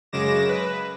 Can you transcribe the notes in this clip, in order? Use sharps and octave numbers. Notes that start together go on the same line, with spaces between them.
F#2 C#3 G#3 D6 A#6 E7
B4